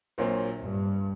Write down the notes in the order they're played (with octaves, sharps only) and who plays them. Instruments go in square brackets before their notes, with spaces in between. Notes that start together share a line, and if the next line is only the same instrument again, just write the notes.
[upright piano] A#1 A#2 F#3 C4
[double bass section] G2